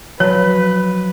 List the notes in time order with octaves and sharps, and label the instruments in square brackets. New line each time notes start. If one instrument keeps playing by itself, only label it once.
[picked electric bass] F3 F#3 [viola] B4 [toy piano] C#5